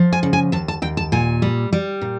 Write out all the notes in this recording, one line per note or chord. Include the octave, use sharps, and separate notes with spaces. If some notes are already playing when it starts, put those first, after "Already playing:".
Already playing: F3
G#5
C#3
G#5
D#2 A5
A5
D#2 G5
A5
A#2 G#5
G3
G3
A#2